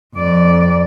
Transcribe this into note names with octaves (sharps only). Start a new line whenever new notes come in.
F2 D5